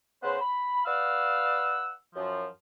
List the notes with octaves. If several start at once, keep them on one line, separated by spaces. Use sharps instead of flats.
C#3 B3 B4 C5
B5
B4 D5 F5 F#5 E6
F#2 F3